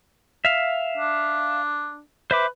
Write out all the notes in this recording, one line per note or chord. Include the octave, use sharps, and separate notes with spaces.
E5 F5
D4
B4 C5 E5 D6